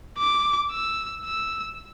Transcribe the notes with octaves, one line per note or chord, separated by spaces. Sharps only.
D6
E6
E6